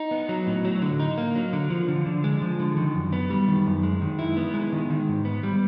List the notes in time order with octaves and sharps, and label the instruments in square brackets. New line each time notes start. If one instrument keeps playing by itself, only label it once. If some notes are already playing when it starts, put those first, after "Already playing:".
Already playing: [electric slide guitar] D#4
B3
F#3
A2
F#3
D3
D#4
A#3
F#3
D3
F3
D3
D3
G#3
F3
D3
D#3
F#2
B3
G3
D#3
F#2
G#3
D#3
E4
B3
G#3
D#3
D#3
G#2
B3
G3